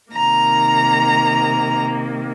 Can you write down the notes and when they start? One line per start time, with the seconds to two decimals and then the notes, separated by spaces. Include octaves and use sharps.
0.12 C3 D#3 A#3 A#5